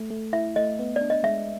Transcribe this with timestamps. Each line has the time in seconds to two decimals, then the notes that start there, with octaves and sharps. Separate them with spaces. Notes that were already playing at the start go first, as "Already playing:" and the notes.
Already playing: A3
0.10 A3
0.33 E4 E5
0.56 A3 D#5
0.79 B3
0.96 D5
1.01 D4
1.10 D#5
1.23 G#3 E5